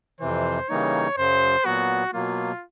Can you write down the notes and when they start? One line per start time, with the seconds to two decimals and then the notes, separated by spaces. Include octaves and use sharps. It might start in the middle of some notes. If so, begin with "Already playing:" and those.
0.20 F2 C3 E3 C5
0.69 C#3 E3 G3 A#3 D#4 C#5
1.17 F#2 C#3 F#3 C5
1.65 A#2 F#3 B3 F#4
2.13 B2 F#3 A#3 F4